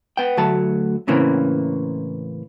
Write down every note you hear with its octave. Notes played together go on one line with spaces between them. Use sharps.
B3 G5
D2 F#3 A3 A5
A2 C#3 E3 A#3 C4